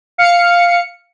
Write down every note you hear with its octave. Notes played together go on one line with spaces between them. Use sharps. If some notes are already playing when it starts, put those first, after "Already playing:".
F5 C#7